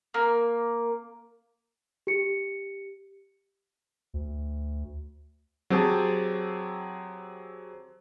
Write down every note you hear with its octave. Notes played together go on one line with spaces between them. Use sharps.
A#3
G4 C#7
D2
F#3 C4 G4 G#4 A5